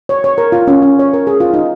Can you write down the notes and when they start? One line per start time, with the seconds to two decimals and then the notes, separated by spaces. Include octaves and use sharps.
0.09 C#5
0.24 C#5
0.38 A#4
0.52 F4
0.68 C#4
0.82 C#4
0.99 C#5
1.13 A#4
1.27 G#4
1.40 F4
1.54 D#4